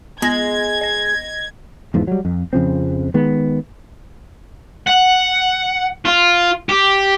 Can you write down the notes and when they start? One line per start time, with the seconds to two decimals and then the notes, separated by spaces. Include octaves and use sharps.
0.22 G#3 B3 G#6 A#6
0.81 D#5 A#6
1.94 E2 G#2 E3 F3
2.07 F#3 G3
2.25 F2
2.53 F2 C#3 F3 C4
3.14 D#3 G#3 B3
4.87 F#5
6.05 F4
6.69 G4